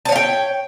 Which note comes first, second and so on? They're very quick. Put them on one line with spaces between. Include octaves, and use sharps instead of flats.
A5 C#5 F5 G5